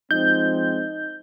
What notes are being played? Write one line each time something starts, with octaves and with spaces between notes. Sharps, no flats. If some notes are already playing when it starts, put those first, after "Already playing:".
F3 G#3 C4 D#4 D#5 G6